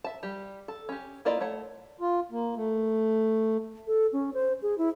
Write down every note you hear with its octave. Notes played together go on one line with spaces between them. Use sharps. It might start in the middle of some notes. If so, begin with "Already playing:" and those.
E5 A5
G3 G4
A4
C#4 G4
A#3 E4 F4 D5 D#5
A3 C#5 F#5
F4
A#3
A3
A4
C#4
C5
G#4
E4